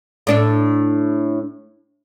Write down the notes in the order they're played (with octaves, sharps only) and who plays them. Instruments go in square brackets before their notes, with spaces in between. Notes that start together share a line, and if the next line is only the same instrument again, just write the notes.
[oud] A2 D4 A4